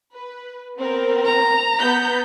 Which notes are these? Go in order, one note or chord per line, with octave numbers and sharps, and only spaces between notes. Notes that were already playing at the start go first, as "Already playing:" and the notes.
B4
B3 C4 A#4
A#5
B3 G6 B6